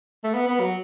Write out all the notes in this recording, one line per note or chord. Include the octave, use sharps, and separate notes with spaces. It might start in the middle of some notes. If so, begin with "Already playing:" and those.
A3
B3
B3
F#3